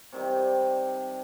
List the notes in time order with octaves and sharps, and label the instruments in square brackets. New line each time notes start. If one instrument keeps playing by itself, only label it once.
[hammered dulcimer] C3 D#3 G3